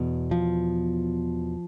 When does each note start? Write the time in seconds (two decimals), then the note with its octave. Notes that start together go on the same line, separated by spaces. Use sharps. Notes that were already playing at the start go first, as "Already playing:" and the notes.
Already playing: E2 B2
0.31 F3